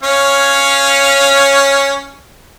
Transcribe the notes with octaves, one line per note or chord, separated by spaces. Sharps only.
C#4 C#5 F5